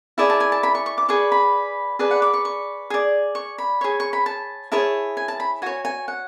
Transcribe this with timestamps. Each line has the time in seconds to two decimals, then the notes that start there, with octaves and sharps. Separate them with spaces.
0.18 E4 G#4 D5 A5
0.30 A5
0.40 G#5
0.52 A5
0.63 B5
0.75 C#6
0.86 C#6
0.98 D6
1.09 G#4 B4 D5 C#6
1.32 B5
1.99 G#4 B4 D5 A5
2.11 F#5
2.22 D6
2.34 C#6
2.45 C#6
2.90 G#4 D5
3.35 C#6
3.58 B5
3.81 G#4 C#5
4.00 C#6
4.13 B5
4.26 A5
4.72 E4 G#4 C#5 A5
5.17 G#5
5.28 A5
5.40 B5
5.62 F#4 C#5 G#5
5.85 G#5
6.08 F#5